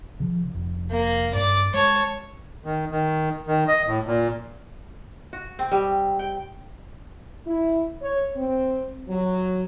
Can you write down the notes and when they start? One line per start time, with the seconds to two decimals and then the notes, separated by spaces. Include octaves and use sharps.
0.20 C#3 F3
0.54 F1
0.91 A#3
1.34 G2 D5 D6
1.74 G#3 C#5 A5
2.65 D#3
2.91 D#3
3.47 D#3
3.68 D#5
3.87 A2
4.06 A#2
5.33 F#4
5.59 C4
5.72 G3
6.19 G5
7.46 E4
8.01 C#5
8.36 C4
9.08 F#3